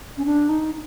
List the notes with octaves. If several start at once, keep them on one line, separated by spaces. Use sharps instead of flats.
C#4
D4
D#4